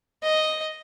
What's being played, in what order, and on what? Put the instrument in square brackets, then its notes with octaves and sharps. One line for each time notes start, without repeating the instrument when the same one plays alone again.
[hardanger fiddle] D#5